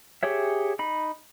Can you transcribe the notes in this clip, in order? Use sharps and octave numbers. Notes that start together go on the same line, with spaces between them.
G4 G#4 C#5 E5
D#4 B5